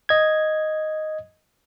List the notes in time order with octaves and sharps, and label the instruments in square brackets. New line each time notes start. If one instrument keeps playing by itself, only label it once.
[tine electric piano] D#5 G#6